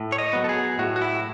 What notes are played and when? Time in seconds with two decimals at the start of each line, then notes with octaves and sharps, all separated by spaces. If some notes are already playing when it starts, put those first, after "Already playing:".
Already playing: A2
0.12 C#5
0.18 D#5
0.33 F#3 B3
0.44 A4
0.49 G#4
0.79 A2 F#4
0.96 F#4
1.02 E4